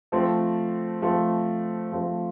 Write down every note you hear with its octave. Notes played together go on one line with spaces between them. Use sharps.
F3 A3 C4
F3 A3 C4
F3 A3 C4